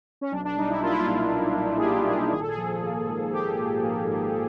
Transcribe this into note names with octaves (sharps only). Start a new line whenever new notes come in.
C#4
B1 D4
D4
G3 D#4
E4
A#3 F4
E4
F4
A#2
B1
G3
G#4
A#3 G4
A#2 G#4
G#1 G#4
A4
G#4
F3
A#3
G#2
G#1 G4
F3
A#3
G#2